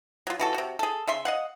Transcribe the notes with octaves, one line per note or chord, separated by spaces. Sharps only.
F#3 F4
E3 F#4 A4
C3 F#4
G#4 A4
C#3 E5 C6
D#5 F5 F#5